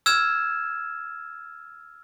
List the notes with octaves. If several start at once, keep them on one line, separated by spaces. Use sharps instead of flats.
E6 F6 G#6 E7